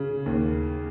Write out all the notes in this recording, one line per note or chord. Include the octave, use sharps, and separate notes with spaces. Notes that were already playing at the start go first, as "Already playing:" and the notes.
Already playing: C#3
D#2